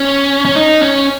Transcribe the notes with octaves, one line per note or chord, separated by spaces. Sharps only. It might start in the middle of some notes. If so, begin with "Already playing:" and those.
Already playing: C#4
C#4
D#4
C#4